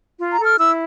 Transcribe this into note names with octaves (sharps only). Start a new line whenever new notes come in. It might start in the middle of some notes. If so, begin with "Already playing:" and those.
F4
A#5
A4
F6
E4 E6